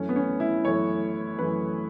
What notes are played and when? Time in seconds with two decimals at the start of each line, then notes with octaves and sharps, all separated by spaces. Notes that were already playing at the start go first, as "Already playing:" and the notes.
Already playing: F#2 E3 A3 C#4
0.09 B3
0.16 C#4
0.40 E4
0.64 F#2 E3 A3 C#5
1.38 F#2 E3 A3 B4